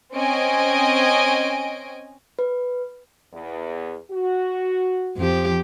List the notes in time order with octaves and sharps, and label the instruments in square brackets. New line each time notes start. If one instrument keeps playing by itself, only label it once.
[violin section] C4 C#4 D#5 G#5 D7
[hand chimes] B4
[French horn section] E2
F#4
[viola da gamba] F2 F3 G4